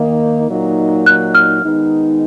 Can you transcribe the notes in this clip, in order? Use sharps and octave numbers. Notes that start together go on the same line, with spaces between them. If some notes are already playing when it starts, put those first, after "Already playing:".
Already playing: D#3 A#3 D#4
A#2 F#3 A#3 D#4
F#6
F6
D#3 G#3 B3 D#4